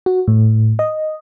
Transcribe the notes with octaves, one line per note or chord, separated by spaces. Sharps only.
F#4
A2
D#5